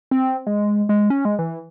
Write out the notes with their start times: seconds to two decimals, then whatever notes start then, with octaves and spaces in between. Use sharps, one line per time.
0.11 C4
0.47 G#3
0.89 G#3
1.10 C#4
1.25 G#3
1.39 E3